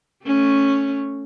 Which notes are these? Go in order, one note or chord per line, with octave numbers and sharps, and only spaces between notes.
A3 C#4